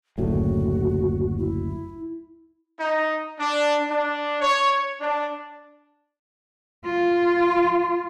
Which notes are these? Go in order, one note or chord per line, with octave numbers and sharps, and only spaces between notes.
F#1 D2 A2 F#4
E4
D#4
D4
D4
C#5
D4
F4